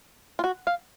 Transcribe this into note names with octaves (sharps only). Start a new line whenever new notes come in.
F4
F#4
F5